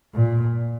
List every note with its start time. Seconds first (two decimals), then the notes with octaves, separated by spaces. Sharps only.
0.14 A#2